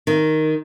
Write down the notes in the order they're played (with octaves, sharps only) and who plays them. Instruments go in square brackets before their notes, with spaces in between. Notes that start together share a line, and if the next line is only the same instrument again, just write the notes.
[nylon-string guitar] D#3